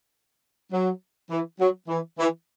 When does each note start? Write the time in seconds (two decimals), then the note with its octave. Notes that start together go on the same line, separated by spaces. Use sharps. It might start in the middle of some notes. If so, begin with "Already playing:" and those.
0.71 F#3
1.30 E3
1.59 F#3
1.88 E3
2.18 E3